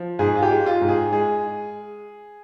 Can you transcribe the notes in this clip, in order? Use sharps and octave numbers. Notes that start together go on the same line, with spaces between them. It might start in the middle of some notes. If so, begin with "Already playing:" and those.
Already playing: F3
G#2 G#4
F4
G4
G#3
F4
G#2
G#4
G#3 G#4